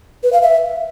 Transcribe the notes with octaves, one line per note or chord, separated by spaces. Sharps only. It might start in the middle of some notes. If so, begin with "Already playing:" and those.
B4
F5
E5